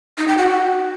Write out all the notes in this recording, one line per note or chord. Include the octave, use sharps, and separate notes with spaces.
D#4
G5
F#4